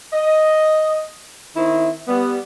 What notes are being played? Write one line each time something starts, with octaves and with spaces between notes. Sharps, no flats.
D#5
D#3 C4 E4
G3 B3